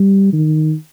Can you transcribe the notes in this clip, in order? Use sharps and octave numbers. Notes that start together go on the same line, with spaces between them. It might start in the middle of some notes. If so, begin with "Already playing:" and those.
Already playing: G3
D#3